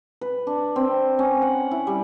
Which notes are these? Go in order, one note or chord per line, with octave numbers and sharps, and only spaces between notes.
B4
D4
C4
C#4
F#5
E4
G3